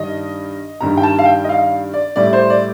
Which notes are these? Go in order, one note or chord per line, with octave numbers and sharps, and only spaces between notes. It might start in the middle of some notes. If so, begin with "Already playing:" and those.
Already playing: G2 D#3 G3 D#5
G2 D#3 G3 A#5
G5
A5
F5
G5
D#5
F5
D5
A2 G3 D5
C5
D5